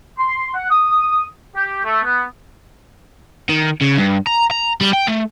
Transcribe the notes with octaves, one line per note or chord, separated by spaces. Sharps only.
C6
F#5
D#6
G4
A3
B3
D#3
C#3
G2
A#5
A#5
G3
G5
A3